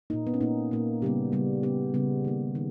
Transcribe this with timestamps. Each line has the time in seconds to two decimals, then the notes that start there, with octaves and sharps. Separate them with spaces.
0.10 A#2 A#3 D#4
0.27 B3
0.34 C#4
0.41 A#2 A#3 D#4
0.71 A#2 A#3
1.02 C#3 G3 B3 G4
1.32 C#3 G3 B3
1.63 C#3 G3 B3 G4
1.94 C#3 G3 B3
2.24 D#3 A#3
2.55 D#3